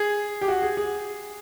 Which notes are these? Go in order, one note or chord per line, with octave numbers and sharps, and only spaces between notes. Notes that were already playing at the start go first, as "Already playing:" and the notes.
Already playing: G#4
G4
F#4
G#4
G#4